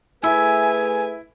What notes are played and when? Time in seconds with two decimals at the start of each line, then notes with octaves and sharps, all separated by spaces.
0.23 A3 E4 G#4 B4 E5 G#5